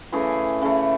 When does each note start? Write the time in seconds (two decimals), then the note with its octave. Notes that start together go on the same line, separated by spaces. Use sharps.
0.12 C#3 E3 A3 G#4
0.62 C#3 E3 A3